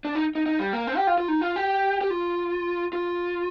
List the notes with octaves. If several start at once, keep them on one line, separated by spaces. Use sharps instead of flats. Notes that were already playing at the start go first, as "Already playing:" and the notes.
D4
D#4
D#4
D#4
G3
A#3
C4
G4
F4
F4
D#4
F4
G4
G4
F4
F4